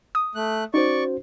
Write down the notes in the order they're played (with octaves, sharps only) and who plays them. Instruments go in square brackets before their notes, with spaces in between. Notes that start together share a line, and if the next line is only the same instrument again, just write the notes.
[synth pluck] D#6
[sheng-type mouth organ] A3 F#6
[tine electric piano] C#4 F#4 C5 [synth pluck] D#4 [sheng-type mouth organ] D5 C#6